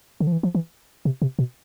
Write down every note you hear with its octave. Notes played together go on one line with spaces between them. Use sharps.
D3
F3
E3
F3
E3
C3
C3
B2